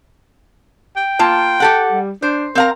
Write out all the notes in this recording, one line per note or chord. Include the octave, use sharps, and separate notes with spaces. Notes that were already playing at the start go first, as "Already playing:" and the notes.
G5
A#3 F4 A5
G4 A4 F#5
G3
D4 C5
C4 A#4 F5 A#5